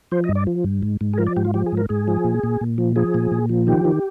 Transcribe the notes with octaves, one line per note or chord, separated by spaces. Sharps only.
F3 C5
D#5
G2
D5
F3
G2
G#2
G#2
G#4
F3 A#4
D5
G#2 G4
F4
F3 G4
G#4
G#2
A#4
G#2 G#4
F3
A#2
A#2
A#2
F3
F3 G#4
A#2
A#2
F3
D#3 G4
D#3